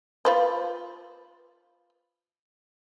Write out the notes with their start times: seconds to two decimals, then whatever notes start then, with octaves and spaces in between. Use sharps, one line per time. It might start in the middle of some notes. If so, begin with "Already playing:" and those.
0.25 F4 B4 C5